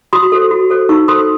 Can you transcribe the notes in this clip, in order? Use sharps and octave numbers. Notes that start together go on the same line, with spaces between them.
F#4 C6 D#6
A4 C5
F#4
A4 C5
D#4 C#6 E6
A4 C5 C6 D#6